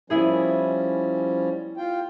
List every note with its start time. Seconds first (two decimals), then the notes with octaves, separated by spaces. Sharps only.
0.10 F3 G3 B3 C#4 E4 G#4
1.77 F4 G5